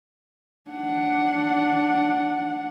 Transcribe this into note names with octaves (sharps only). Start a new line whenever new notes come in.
D4 F#5